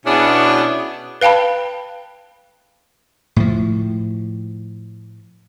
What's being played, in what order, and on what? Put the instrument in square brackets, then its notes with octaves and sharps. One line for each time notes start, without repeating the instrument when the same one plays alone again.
[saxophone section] B2 B3 C#4 D4 E4 G#4
[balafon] B4 F5 G5 A5 B5
[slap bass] A2 F3